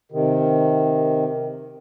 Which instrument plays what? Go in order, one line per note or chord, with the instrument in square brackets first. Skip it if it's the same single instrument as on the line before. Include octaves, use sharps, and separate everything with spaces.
[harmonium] C3 D#3